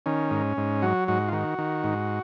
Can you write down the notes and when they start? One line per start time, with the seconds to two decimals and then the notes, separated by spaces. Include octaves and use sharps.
0.06 D#3 C#4
0.31 G#2
0.57 G#2
0.82 F#3 F#4
1.08 G#2 F#4
1.28 F4
1.32 D#3 F#4
1.58 D#3
1.84 G#2